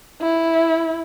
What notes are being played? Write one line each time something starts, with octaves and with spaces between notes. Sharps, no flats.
E4